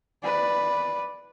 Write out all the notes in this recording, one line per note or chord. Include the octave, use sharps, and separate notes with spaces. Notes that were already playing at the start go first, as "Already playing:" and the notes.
B4 D5